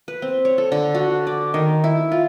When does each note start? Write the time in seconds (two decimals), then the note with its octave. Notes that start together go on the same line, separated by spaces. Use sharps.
0.08 B4
0.22 C4
0.45 C#5
0.58 A4
0.72 D3
0.95 F#4
1.27 D5
1.54 D#3
1.84 E4
2.12 F4